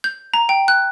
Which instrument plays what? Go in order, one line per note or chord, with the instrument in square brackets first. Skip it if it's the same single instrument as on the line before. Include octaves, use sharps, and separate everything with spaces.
[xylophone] G6
A#5
G5
F#6